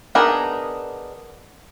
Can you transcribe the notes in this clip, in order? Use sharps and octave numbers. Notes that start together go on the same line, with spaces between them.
B3 D4 D#4 G#4 A#4